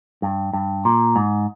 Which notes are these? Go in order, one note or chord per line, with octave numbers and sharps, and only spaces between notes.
G2
G2
A#2
G#2